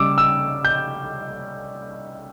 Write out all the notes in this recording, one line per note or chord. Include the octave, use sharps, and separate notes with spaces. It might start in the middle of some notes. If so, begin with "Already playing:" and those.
Already playing: C#3 G3 D6 E6
E6
G6